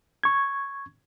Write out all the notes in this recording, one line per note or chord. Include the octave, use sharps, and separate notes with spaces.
C#6 G#6